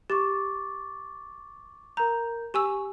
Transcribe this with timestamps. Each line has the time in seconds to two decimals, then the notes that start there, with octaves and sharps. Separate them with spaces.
0.10 G4 C#6 D6 A6
1.97 A#4 A#5 G6
2.54 G4 G#5 C#6 E6